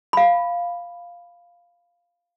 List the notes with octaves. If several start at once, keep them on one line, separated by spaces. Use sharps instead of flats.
F5 B5